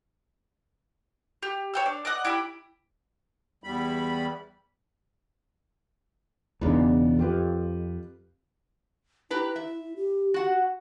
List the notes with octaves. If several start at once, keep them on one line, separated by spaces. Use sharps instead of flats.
G4
C#5 G5 E6
D4
D5 D#5 F#5
E4 G4 B5
E2 G3 B5
E1 E2 C#3 B3 D4 D#4
F2 F4 G4 B4
E4 G4 B4 A#5
E5
G4
F#4 F#5